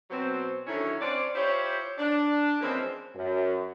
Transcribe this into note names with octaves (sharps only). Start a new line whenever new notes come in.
B2 F#3 C4
D3 D#3 F#3 C#4 E4
C4 C#4 C5 D5
E4 F4 G4 C5 C#5
D4
E3 F3 G#3 A#3 C4 C#4
F#2